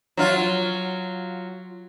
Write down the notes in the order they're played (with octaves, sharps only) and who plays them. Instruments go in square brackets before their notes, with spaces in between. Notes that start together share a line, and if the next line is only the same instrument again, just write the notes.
[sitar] F#3 F4